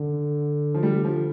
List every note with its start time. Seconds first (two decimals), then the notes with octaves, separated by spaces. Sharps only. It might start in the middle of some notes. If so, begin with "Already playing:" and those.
Already playing: D3
0.74 F3
0.83 G3
1.05 F3